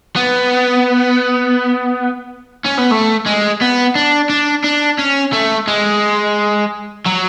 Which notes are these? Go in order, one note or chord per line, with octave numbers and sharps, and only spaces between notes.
B3
C#4
B3
A3
G#3
B3
D4
D4
D4
C#4
A3
G#3
F#3